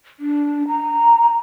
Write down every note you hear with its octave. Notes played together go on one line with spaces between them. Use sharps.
D4
A#5